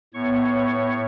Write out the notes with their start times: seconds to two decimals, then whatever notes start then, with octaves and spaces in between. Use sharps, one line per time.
0.14 A2 B3 C#5 C#6